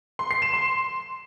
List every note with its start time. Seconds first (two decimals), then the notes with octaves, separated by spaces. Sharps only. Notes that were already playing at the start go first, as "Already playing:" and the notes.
0.19 C6
0.31 C7
0.42 E7
0.53 C6